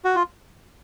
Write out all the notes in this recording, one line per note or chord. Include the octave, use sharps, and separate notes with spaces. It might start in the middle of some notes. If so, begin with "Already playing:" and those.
F#4
F4